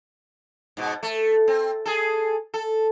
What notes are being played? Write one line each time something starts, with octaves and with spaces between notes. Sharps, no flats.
G#2 B2
A3
C4
G#4 A4
A4